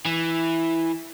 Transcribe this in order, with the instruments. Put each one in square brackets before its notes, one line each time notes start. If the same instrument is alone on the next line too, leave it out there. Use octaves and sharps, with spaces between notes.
[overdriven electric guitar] E3